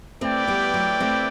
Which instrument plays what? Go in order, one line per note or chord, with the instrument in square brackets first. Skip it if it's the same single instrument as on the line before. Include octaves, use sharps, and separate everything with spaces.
[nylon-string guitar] A3 C4 [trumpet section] E4 G4 B4 D5 G5
[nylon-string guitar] G3 B3
F#3 A3
A3 C4